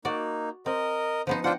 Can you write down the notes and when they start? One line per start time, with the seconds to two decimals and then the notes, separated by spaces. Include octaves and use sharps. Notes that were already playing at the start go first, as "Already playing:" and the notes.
0.05 A#3 D#4 F#4 D5
0.66 C4 A#4 D#5
1.27 F3 B3 D#4 C5
1.44 D4 F4 C5 F#5 G5